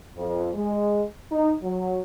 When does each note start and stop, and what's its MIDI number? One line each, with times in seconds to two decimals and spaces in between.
0.17 0.50 41
0.54 1.02 56
1.31 1.53 63
1.62 2.00 54